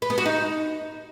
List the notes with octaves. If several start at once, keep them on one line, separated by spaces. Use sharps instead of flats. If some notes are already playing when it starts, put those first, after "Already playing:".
B4
B3
F#4
D#4